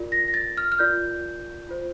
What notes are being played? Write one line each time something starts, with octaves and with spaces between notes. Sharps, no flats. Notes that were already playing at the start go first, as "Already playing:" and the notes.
Already playing: F4 A#4 D5
A#6
A#6
A6
F6
F6
F4 A#4 D5 G6
F4 C5